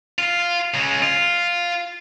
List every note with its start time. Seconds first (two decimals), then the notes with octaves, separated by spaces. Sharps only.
0.18 F4
0.74 C#3 G#3
1.02 F4